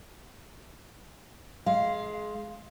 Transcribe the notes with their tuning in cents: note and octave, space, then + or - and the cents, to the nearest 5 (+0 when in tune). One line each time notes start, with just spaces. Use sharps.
G#3 +20 F5 -10